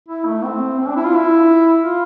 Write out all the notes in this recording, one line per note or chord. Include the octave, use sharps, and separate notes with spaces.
E4
A3
C4
C4
D4
E4
F4
E4
F4